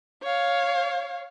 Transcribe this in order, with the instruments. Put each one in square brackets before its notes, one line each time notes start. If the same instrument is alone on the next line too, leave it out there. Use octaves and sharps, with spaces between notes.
[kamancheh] C#5 F5